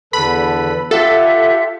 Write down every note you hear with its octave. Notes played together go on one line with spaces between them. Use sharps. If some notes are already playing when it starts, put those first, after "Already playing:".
E2 D3 A4 B4 B5
F4 G4 A4 E5 F#5